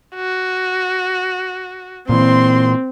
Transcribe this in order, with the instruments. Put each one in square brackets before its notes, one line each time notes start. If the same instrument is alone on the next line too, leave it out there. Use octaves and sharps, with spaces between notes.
[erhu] F#4
[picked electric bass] A#2 E3 [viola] C4 [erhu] C6